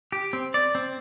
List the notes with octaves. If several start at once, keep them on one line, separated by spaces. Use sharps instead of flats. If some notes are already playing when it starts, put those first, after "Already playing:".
G4
C4
D5
C4